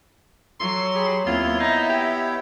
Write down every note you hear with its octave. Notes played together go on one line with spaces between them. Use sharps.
F#3 A4 C6
G4 G#4 B5
D#2 B3 C4 E4 F4 C#5
D#4 E5
G4